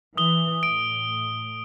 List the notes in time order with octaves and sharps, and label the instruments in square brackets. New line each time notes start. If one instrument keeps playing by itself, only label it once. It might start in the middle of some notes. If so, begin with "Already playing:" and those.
[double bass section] E3 [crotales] D#6 G7
[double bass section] A2 [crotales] D7